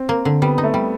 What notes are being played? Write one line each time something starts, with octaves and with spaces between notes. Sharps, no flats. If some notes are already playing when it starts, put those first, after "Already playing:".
Already playing: C4
A#3
D3
G3 B3
D#4
A3
G3